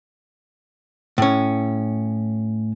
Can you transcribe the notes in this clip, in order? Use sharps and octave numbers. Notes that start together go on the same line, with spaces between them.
A2 C#4